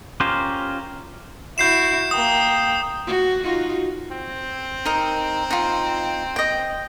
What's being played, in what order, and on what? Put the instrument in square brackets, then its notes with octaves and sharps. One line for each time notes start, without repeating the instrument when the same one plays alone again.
[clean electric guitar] C#4 F4 G4 A#4 C5
[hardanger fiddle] E4 F#4 [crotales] G6 C7 E7
[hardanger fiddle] A#3 G5 [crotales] D#6
[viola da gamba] F#4
D#4 F4 F#4
[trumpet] C4
[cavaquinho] D#4 A#4
D#4 F4
D#5 G5